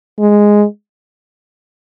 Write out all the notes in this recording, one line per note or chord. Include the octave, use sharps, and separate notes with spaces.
G#3